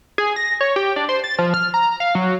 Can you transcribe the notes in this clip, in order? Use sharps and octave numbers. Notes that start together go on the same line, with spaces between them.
G#4
A#6
C#5
G4
D4
C5
A6
F3
F6
A#5
F5
F#3